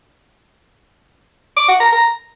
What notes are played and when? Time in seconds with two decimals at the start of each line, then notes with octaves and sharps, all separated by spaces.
1.57 D6
1.68 F#5
1.80 A#5
1.92 A#5